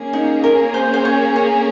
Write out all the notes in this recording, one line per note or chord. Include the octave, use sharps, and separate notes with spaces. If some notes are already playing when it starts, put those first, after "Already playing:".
Already playing: A#3 C#4 G#4
D#4
A#4
C5
C5
C#5
C#5